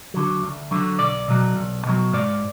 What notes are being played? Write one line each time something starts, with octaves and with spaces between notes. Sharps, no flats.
D3 F#3
D2
D3 F#3
B1 D5
B2 F#3
B1
B2 F#3
G#2 D5